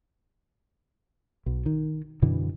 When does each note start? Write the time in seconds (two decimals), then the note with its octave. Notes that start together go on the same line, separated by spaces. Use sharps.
1.46 B1
1.66 D#3
2.22 F#2 B2 D3 E3